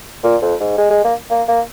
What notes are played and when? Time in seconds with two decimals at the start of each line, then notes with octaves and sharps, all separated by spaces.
0.24 A#2
0.42 F2
0.60 G#2
0.77 G#3
0.90 G#3
1.04 A#3
1.31 A#3
1.48 A#3